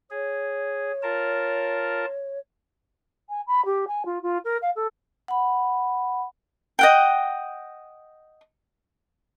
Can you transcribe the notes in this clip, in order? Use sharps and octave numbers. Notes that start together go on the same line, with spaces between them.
G#4 C#5
F4 A#4 A5
G#5
B5
G4
G#5
F4
F4
A#4
F5
A4
F#5 B5
D#5 F#5 G5